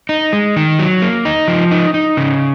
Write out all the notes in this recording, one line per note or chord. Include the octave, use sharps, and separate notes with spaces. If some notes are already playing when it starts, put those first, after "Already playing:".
D#4
G#3
D#3
F#3
A#3
D#4
F3
D#4
D#4
C#3